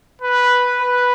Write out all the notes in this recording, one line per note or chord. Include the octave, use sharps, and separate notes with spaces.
B4
B4